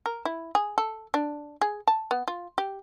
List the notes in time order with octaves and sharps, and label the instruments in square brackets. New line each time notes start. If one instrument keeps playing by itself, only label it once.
[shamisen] A#4
E4
G#4
A4
D4
G#4
A5
B3
F4
G4